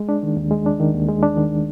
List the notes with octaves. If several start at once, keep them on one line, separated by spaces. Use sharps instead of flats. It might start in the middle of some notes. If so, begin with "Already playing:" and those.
Already playing: G#3
D4
D#3
D#2
G#3
D4
D#3
D#2
G#3
D4
D#3